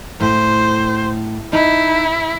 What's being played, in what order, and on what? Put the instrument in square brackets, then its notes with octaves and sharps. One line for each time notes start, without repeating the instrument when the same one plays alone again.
[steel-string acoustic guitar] A2 [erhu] C5
[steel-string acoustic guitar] D#4 [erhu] E4